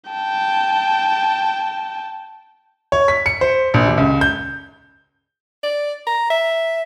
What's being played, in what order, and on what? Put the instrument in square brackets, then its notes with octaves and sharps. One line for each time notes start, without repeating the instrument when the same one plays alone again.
[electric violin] G5 A5
[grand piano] C#5
B6
C#7
C5
A#1
D#2
C#2
G6
[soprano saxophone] D5
A#5
E5